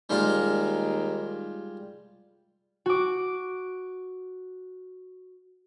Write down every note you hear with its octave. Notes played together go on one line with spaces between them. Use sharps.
D#2 G3 G#3 F4
F#4 D6